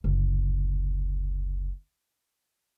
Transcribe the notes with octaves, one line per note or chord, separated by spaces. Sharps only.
F#1 D2